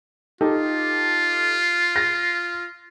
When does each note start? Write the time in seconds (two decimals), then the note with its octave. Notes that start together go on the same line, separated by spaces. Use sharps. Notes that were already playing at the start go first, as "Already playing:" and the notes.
0.41 D#4 F4 G4 A4
1.96 A6 A#6